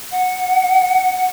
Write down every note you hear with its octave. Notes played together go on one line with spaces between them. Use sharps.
F#5